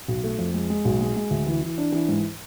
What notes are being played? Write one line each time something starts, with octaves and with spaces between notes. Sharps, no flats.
B1
A3
F2
G#3
G#3
B1
G#3
G#3
D2
E3
E3
D4
E3
G#2